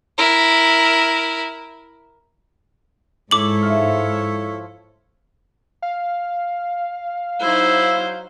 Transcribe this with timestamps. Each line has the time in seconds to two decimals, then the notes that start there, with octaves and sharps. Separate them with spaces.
0.18 E4 A#4
3.31 G#2 E4 A4 C#5 D6 F#7
3.62 F3 E5 F5
5.82 F5
7.43 F#3 D#4 E4 C5